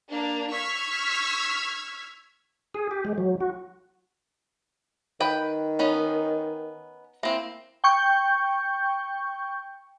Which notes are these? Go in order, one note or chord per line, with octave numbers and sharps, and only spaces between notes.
A#3 D4
C#6 E6 F6 G#6 B6
G#4
G4
G#3
F#3
F#4
D#3 B4 G5
B3 C#4 D#4
A#3 C4 E4
G5 C#6 G6